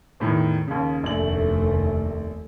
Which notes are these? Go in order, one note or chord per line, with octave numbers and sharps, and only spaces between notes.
E2 A2 D#3
D#2 C#3
F1 A#1 D#2 A3 F#7